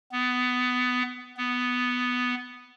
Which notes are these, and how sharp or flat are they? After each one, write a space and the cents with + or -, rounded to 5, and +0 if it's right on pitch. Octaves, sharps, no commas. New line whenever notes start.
B3 +15
B3 +5